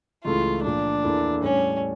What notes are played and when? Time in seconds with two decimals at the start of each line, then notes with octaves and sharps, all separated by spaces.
0.25 C#2 C#3 E3 A3 E4 F4
0.64 A#2 F3 A3 D4
1.03 E2 E3 A#3 E4 A4
1.42 A2 G3 C#4 D4 A4